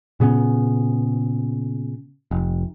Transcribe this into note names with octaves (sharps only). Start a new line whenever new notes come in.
A#2 C#3 B3 C#4
F1